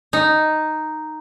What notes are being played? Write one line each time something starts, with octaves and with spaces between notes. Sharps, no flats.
D#4